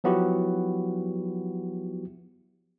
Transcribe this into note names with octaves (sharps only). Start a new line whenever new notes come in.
F3 F#3 B3 E4 F#4 G4